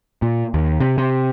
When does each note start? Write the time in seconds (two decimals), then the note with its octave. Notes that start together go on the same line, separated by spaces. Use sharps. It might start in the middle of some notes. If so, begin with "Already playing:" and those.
0.22 A#2
0.54 D#2
0.80 C3
0.98 C3